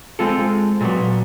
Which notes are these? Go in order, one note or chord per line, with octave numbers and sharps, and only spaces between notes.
G#3 C4 F4 A4
A#2 F#3 B3